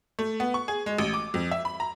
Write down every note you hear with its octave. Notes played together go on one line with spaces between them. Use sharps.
A3
B3
C#6
G#4
G#3
A1
D6
F2
E5
B5
A#5